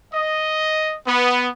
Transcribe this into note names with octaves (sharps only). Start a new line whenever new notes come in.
D#5
B3